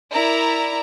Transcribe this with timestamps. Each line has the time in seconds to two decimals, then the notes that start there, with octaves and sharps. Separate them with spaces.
0.12 E4 A#4 D5 A#5